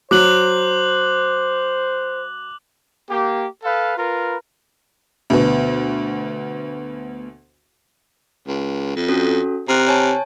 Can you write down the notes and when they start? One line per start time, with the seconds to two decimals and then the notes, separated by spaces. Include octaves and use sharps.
0.11 F#3 C5 D6 F#6 F#7
3.10 A#3 G4
3.64 A4 B4 F5
3.97 F4 A#4 B4
5.30 D2 B2
8.48 C#2
8.96 F2
9.09 C#4 F#4 A4
9.68 C3 A#5 F6 F#6
9.88 C#5 G#5 A5